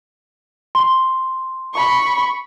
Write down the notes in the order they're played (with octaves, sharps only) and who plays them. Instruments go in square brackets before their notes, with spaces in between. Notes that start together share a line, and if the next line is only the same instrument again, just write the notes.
[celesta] C6
[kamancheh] B5 C#6